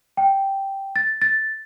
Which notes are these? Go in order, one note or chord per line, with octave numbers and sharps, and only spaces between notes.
G5
A6
A6